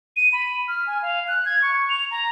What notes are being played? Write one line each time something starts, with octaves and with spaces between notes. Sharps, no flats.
D#7
B5
F6
G#5
F5
F#6
G#6
C#6
F7
A#5